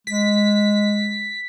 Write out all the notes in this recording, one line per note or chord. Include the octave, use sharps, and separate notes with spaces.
G#3 B6